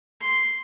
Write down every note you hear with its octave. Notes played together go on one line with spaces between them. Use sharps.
C6